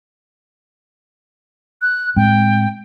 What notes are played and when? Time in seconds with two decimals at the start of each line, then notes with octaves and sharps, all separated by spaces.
1.82 F#6
2.16 A2 G#3 C4 G5